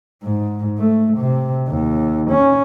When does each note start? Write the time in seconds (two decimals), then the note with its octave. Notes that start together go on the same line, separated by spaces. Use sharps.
0.24 G#2
0.79 A3
1.18 C3
1.69 D#2
2.31 C#4